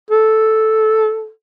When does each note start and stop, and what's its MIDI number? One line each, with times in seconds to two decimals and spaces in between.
0.10 1.30 69